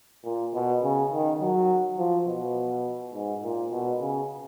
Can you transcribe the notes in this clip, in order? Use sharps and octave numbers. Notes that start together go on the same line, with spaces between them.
A#2
B2
C#3
D#3
F#3
F3
B2
G#2
A#2
B2
C#3